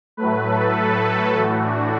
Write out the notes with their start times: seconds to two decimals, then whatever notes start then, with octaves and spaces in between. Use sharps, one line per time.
0.17 A2 F#3 A3 B4
0.47 A4
0.76 A4
1.34 A2 E3 A3 F#4
1.63 D4